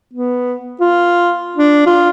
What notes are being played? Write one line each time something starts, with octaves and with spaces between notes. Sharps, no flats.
B3
F4
D4
F4